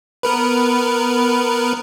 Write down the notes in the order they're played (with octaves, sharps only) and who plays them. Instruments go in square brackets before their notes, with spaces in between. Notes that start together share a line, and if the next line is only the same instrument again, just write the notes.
[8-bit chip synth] B3 A#4 B4